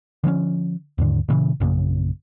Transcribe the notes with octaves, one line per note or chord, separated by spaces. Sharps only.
D3 F3 A#3 C#4
D#2 G#2 D3
A#2 C#3 E3
A#1 F#2 C#3 A#3